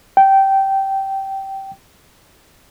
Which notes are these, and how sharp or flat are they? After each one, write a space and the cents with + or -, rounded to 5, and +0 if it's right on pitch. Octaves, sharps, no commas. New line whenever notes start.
G5 -15